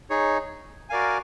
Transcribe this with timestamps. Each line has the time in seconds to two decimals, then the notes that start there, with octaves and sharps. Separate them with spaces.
0.10 D#4 G#4 C#5
0.89 F#4 A#4 D5 F5 G#5